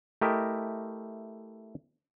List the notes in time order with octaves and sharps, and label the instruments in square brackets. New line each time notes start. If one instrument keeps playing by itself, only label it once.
[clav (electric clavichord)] A3 E4 G4 A#4 D#5 E5